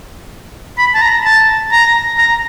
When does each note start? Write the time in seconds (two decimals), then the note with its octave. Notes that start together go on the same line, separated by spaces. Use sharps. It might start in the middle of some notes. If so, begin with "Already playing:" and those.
0.78 B5
0.95 A5
1.02 A#5
1.25 A5
1.72 A#5
2.18 A#5